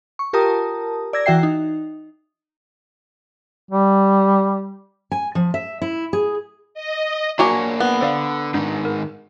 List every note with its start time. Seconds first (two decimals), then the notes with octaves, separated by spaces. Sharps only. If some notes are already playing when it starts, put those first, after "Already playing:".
0.19 C#6
0.33 F4 G4 A#4 A5 A#5 D#6
1.13 D5 E6 G#6 A#6
1.26 E3 F#4 E5 G5 C7
1.43 D#4
3.71 G3
5.12 G#5
5.35 F3
5.54 E5
5.82 E4
6.13 G#4
6.74 D#5
7.39 F#3 A#3 D4 F#4 C#5 G#5 D6
7.80 B3
8.01 D3 C5 D5 F5
8.54 G#2 D#3 D4
8.85 A#4